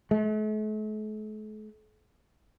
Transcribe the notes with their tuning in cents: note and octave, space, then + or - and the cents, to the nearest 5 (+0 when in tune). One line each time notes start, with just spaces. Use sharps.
A3 -45